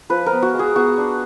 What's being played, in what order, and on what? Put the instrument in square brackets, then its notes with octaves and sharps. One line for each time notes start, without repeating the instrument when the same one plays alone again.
[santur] F3 B4
A#4
B3
F#4
G#3
G#4
B3 F#4
D4